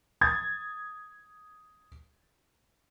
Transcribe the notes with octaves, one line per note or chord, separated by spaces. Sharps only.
D#6 G#6 A6